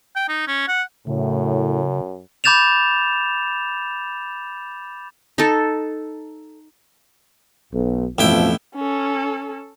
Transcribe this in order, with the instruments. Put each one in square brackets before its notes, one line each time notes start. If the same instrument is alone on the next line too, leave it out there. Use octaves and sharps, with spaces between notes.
[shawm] G5
D#4
C#4
F#5
[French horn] F#2 [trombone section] A2 [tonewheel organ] C#3
[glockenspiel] B5 D6 G6 A6 E7 F7
[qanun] D#4 A4
[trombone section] B1
[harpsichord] A1 E4 G5 [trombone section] F2 B2 F3
[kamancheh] C#4 A4